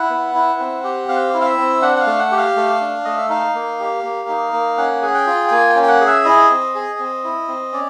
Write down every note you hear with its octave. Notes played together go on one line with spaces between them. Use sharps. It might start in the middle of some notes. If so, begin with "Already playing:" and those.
Already playing: E4 F#5
B3
E4
C4
G4
C4 F5
E4
F5
E5
C4
D4 F#5
F#5
F5
A3
F#5
G4
F5
A3
D4
A3 D#5
E5
D#4 F5
A#3
G4
A#3
D#4
A#3
C#4 F#5
G#4 F#5
G5
F4
G5
A#3 G#5
G5
C#4
G5
F#5
G#4
E5
E4 D#5
C4
G#4
C4
E4
C4
C#4 D5